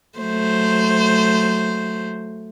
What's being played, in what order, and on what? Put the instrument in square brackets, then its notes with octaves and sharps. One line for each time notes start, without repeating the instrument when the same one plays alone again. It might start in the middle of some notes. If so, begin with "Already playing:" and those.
[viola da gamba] F#3 A3 C5